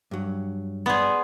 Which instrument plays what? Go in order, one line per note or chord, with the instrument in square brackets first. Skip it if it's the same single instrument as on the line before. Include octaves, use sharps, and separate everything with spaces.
[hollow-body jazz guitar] G2 F#3
[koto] B3 G#4 [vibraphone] D5 C6